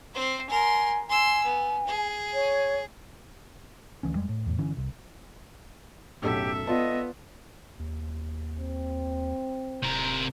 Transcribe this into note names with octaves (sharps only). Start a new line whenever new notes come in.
C4 C5
A#4 G#5 C6
G#5 C6 E6
B3
G#4
C#5
D2 E3 C#4
F2 G3 G#3
A2
E2 A2
G1 D3 E3 C#4
C2
B1 F#2 A2 G4 A4 E5
B3 F4 D5 D#5 A5
D#2
C4
D1 C3 A#4